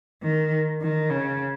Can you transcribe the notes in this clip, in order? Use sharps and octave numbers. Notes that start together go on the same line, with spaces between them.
D#3
D#3
C#3